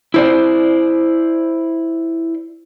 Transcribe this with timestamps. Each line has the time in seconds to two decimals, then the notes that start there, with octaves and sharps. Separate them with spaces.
0.14 E4 C5 D5